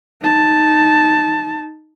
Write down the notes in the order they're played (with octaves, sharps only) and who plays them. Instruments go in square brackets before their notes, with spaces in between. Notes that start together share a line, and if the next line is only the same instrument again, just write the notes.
[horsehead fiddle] D#4 A5